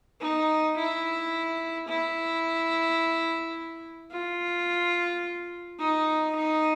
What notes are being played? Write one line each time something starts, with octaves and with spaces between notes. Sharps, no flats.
D#4
E4
E4
F4
D#4
D#4